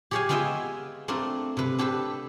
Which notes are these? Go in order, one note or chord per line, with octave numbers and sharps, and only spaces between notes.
G4 G#4 C#5 D5 F5 G#5
G#3 B3 F4 D#5 E5 G5
A3 C4 D4 F4 A#4
C3 B4
D4 G4 A4 B4 C5